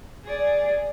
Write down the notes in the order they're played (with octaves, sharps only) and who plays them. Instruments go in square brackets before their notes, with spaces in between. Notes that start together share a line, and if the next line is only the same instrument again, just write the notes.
[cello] G#4 D5